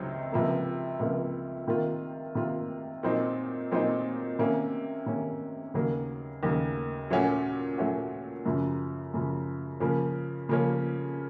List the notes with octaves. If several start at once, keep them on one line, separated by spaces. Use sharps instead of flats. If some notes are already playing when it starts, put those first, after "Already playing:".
Already playing: C#2 C3 F#3 C4 D#4
C#2 C3 F3 A#3
C#2 C3 F3 A#3
C3 D#3 A#3 F4
C3 D#3 A#3 F4
A#2 F#3 C4 D#4
A#2 F#3 C4 D#4
C3 D#3 A#3 C#4
C3 D#3 A#3 C#4
D#2 C#3 F#3 A#3
D#2 C#3 F#3 A#3
A#2 F#3 A3 C#4 F#4
A#2 F#3 A3 C#4 F#4
F#2 C#3 F3
F#2 C#3 F3
C#3 F3 A#3 C#4
C#3 F3 A#3 C#4